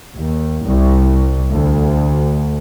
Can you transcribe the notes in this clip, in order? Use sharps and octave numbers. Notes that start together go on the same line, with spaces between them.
D#2
C2
D2